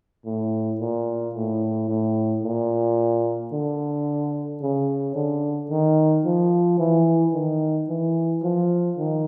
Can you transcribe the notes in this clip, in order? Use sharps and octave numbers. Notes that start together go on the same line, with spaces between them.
A2
A#2
A2
A2
A#2
D3
C#3
D3
D#3
F3
E3
D#3
E3
F3
D#3